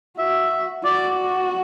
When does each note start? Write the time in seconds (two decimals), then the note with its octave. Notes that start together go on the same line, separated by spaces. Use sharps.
0.18 F#4 E5
0.84 F#4 D5